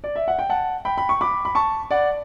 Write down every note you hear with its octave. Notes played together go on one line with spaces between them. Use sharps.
D5
E5
F#5
G5
F#5 A5
G5 B5
B5
C#6
B5 D6
B5
A5 C#6
D5 F#5